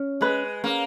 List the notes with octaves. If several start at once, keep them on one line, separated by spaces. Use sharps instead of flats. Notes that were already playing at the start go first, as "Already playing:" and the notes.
Already playing: C#4
G#3 B4
A#3 C#4